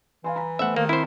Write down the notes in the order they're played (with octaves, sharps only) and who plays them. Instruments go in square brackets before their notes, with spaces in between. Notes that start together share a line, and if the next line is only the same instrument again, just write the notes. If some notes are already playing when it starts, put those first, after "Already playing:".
[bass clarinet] E3 [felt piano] F5 G#5 C6
[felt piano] A#5 B5
[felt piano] A3 B3 C5 [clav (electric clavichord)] E5 F#5
[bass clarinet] D#3 [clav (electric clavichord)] A#3
[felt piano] C4 [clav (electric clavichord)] E4 C5